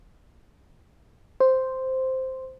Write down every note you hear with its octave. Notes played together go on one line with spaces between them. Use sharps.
C5